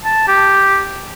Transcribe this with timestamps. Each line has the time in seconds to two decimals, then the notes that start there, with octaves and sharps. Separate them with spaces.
0.05 A5
0.28 G4